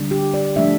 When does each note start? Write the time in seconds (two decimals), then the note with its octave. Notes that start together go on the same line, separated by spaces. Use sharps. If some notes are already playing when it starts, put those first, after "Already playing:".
Already playing: D3 G3 D4
0.11 G4
0.34 D5
0.56 F3 A3 D4 E5